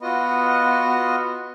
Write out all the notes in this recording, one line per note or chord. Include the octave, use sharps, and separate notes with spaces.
B3 F4 F#4 D#5